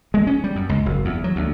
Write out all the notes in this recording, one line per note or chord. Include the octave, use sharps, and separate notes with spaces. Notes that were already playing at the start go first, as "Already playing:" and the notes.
G#3
C#4
G3
F#2
C#2
F#1
E2
F#3
D2